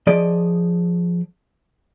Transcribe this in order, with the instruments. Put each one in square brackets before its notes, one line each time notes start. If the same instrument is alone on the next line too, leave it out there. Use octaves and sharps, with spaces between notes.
[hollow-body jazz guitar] F3 G#4 D5 D#5